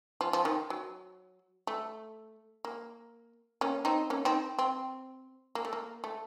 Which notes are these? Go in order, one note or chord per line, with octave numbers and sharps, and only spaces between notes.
F3
F3
D#3
F#3
A3
A#3
A#3 C#4
C4 D#4
A#3 C#4
C4 D#4
C4
A#3
A3
A#3
A3